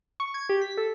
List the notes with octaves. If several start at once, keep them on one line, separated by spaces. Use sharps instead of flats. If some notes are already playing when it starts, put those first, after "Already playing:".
C#6
G#6
G4
B6
A4